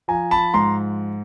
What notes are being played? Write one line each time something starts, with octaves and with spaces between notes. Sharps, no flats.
F3 G#5 A#5
A5 B5
G#2 A#5 C6